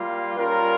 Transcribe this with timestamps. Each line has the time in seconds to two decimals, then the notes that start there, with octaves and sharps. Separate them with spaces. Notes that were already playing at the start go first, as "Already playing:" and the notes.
Already playing: G3 A#3 F4
0.36 G3 C#4 F4 A#4